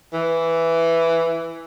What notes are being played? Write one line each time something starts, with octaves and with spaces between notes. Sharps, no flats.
E3